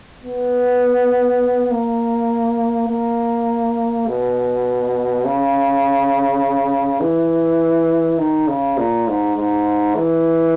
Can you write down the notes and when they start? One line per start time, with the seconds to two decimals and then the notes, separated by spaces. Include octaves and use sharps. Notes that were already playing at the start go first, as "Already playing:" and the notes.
0.23 B3
1.71 A#3
2.89 A#3
4.07 B2
5.25 C#3
7.01 E3
8.18 D#3
8.47 C#3
8.78 A#2
9.08 G#2
9.37 G#2
9.96 E3